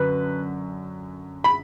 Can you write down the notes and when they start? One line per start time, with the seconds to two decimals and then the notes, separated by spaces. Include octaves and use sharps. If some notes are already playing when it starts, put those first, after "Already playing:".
Already playing: F#2 D3 B4
1.44 B5